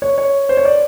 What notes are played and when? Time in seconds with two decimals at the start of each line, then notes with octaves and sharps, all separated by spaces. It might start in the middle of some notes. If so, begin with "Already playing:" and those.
0.02 C#5
0.18 C#5
0.49 C5
0.57 C#5
0.65 D5